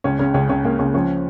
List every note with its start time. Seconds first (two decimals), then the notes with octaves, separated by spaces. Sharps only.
0.04 C#2 C#4
0.19 C#3 C#4
0.34 C#2 C#4
0.49 C#2 C#4
0.64 C#2 A#3
0.79 C#2 C#4
0.94 F3 C#4